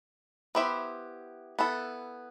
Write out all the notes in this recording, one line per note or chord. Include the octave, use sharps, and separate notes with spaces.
B3 E4 G4 C5 E5
B3 E4 A4